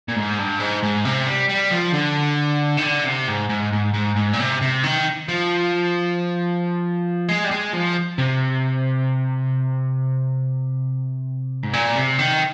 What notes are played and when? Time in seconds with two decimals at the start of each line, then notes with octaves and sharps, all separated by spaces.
0.08 A#2
0.16 G#2
0.38 G2
0.60 G#2
0.83 G#2
1.05 C3
1.27 G3
1.49 G3
1.71 F3
1.94 D3
2.78 D#3
2.83 D3
3.05 C3
3.28 G#2
3.49 G#2
3.73 G#2
3.94 G#2
4.16 G#2
4.33 A#2
4.39 C3
4.61 C3
4.84 D#3
5.28 F3
7.28 G#3
7.44 G3
7.51 G#3
7.73 F3
8.18 C3
11.63 G#2
11.73 A#2
11.96 C3
12.19 D#3